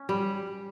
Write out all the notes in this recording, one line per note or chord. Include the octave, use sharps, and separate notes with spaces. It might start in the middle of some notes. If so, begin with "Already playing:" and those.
Already playing: C#4
G3